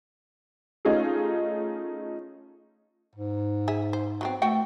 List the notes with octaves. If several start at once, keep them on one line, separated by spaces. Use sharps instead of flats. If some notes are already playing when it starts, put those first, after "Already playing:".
A3 C#4 D#4 F4 G4 G#4
G#2
G#4 E5
C5
F#3 B3 C4
E3 A3 F#4 G5